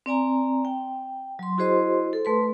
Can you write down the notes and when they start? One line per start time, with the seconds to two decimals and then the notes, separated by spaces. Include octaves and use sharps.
0.06 C4 D5 G#5 A#5
0.65 G5
1.39 F#3 C6
1.58 E4 F#4 G#4 C5 D#5 C6
2.13 A4
2.25 A3 B4 C6